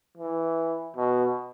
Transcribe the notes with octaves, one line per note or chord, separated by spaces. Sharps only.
E3
B2